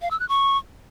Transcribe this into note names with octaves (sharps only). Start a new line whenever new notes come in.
F5
E6
F#6
C#6